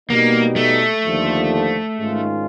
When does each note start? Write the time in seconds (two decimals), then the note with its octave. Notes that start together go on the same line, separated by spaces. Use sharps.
0.09 B2 G3 A#3 B3 D#4
0.56 A3
1.04 D#2 D3 F3
1.98 G#2 D#3 G#3 C#4 F4